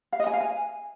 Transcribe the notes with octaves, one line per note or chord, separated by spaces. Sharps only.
F5
D#5
G#5
F5
G#5